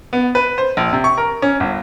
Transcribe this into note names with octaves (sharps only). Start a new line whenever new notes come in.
B3
B4
C5
A#1
C3
C#6
A#4
C#4
G1